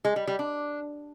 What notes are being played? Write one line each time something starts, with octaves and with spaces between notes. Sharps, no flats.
G#3
G3
G3
D4